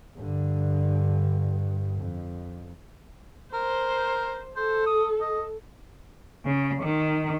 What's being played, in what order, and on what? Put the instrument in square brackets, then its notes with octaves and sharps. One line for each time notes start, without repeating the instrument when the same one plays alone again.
[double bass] G2 D3
F2
[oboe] A#4 [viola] C5
[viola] A4 [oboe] C5
[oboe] D#6
D#5
[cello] C#3
D#3